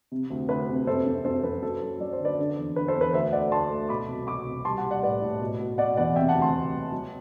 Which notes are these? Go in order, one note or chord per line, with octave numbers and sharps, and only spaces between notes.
C3
D2
D2 B4
C3
F#2 A4 C5
F#2
F#2 A4 C5
F#2 B4
F#3 A4 C5
F#3
F#3 D5
C5
D3
B4 D5
D3
E2
D3 B4
A4 C5
E2
B4
D2 C5 E5
A3 D5 F#5
D2 A5 C6
A3
B2 B5 D6
C2
B2 B5 D6
C2
G3 A5 C6
F#5 A5
G3
D5 F#5
A2 B4 D5
A2
B2
B2
B2 D5 F#5
E2 D5 F#5
C3 E5 G5
F#5 A5
D2
A5 C6
D2
F#3
F#3